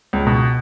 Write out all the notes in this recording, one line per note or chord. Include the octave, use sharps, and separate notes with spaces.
C#2
B2